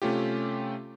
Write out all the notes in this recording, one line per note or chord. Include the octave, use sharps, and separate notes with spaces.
C3 A3 C#4 F4 G4